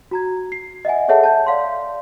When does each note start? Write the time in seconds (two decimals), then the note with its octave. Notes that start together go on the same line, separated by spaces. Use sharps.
0.11 F#4 A#5 G#6
0.52 C7
0.85 D#5 E5 F#5 G#5
1.08 G#4 A4 C#5 E5 F#5 A5
1.24 A5 G6
1.46 D5 F5 C6